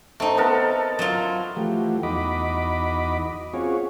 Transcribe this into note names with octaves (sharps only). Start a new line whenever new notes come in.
A3 C4 D#4
B3 A4 A#4
F#3 F4
E3 F3 A3 F#4 G4
E2 D#4 F#4 D#5 B5 D6
C4 C#4 F4 F#4 G#4 C#5